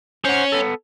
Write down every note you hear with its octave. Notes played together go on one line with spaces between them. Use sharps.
C5 C#5 F#5 G#5
B3 A4